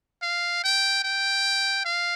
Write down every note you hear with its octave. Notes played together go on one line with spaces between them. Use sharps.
F5
G5
G5
F5